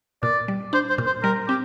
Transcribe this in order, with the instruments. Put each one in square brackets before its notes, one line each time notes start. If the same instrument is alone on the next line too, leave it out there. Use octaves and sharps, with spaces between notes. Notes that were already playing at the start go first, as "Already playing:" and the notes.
[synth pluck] A#2 [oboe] D5
[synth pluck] G3
[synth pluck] D4 [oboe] C5
[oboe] C5
[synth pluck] A#2
[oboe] C5
[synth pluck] G3 [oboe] A#4
[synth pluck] C4 [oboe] G4